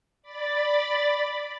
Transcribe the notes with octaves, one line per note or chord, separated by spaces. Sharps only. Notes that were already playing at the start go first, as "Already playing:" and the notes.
D5 B5 A6